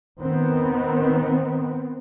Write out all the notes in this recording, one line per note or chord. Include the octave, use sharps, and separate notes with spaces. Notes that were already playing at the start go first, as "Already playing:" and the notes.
D#3 B3 C4